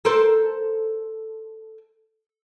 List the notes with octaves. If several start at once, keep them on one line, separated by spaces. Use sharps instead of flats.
A4 A#4 C5